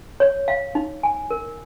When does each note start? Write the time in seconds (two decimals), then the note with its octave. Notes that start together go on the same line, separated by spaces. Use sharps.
0.20 C#5
0.48 F5
0.75 D#4
1.03 G#5
1.31 A#4